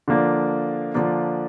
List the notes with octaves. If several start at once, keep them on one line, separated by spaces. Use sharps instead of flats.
D3 F3 A#3 D4
D3 F3 A#3 D4